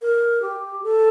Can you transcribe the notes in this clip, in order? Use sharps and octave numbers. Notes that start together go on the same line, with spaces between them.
A#4
G4
A4